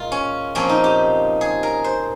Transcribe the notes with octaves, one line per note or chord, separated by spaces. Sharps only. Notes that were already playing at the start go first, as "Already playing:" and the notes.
Already playing: A#2 G#3 F4
C#4
A#2 F3 C4 C#4
D#4
G4
G#4
A#4
C5